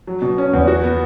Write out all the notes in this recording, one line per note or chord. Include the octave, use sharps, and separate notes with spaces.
F#3
B2
C#4
E2
F#4
B3